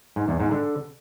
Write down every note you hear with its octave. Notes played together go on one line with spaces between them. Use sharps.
G#2
E2
G#2
D3